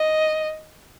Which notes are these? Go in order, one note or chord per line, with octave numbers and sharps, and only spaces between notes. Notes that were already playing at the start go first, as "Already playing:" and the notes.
Already playing: D#5